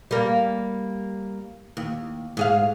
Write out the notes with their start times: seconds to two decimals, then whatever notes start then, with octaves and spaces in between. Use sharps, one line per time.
0.11 G3 A#3
1.77 D#2
2.37 G#2 G#4 F5